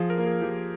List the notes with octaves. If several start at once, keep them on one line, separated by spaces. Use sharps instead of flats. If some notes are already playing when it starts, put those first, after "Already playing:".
Already playing: F3 G#4
A#4
A#3
G#4
F3 G4